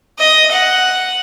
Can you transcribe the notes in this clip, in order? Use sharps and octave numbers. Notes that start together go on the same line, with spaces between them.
D#5
F#5